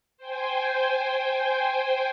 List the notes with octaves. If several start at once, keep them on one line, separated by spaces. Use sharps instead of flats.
C5 G5 G#5